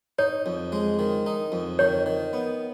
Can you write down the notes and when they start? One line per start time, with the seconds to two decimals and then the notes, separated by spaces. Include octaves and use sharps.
0.19 D#4 C#5
0.46 F2
0.72 G#3
0.99 D#3
1.26 D#4
1.52 F2
1.79 D#3 C#5
2.06 D#3
2.33 B3